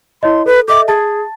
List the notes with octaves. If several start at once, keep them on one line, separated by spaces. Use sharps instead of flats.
E4 C#5 D#5 C6
A4 B4
A4 D#5 E5 D6
G#4 A5 A6